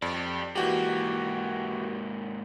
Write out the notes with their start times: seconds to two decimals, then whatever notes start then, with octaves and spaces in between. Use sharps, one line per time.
0.02 F2 G4 D5
0.55 G#2 E3 A#3 F#4 G4